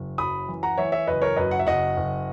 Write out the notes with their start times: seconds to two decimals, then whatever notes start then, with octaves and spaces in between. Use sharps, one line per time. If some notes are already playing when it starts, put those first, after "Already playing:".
Already playing: F#1
0.18 F#2 B5 D#6
0.49 E3
0.63 F#5 A#5
0.78 E3 C#5 E5
0.92 C#5 E5
1.07 F#1 B4 D#5
1.22 A#4 C#5
1.36 F#2 B4 D#5
1.51 F#5
1.59 E5
1.66 F#1 D#5 F#5
1.97 F#1